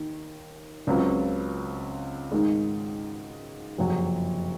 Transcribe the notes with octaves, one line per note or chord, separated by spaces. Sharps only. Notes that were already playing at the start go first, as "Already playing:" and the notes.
Already playing: D#2 D#3
C#2 C#3 F#3 C4 F4
G#2 D#3 G#3
F#1 F2 C3 F#3